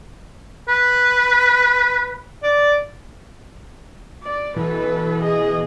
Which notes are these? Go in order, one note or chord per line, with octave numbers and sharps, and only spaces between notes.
B4
D5
D5
B2 E3 A4 B4
G#4 D#5